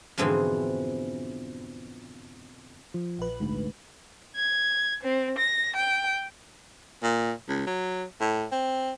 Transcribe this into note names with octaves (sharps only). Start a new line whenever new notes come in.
F2 G#2 B2 D3 E3 C4
F3
A#1 B4
D2 G#2
G#6
C4
A#6
G5
A#2
C#2
F#3
A2
C4